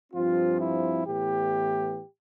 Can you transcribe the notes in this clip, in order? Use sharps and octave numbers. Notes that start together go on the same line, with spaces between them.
G2 F3 C4 F4
E4
A2 E3 B3 G4